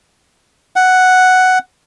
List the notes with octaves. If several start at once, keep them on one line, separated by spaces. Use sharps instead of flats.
F#5